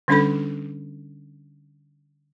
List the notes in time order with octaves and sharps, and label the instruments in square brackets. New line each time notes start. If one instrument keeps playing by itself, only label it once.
[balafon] D3 G3 C#4 D4 A4 B5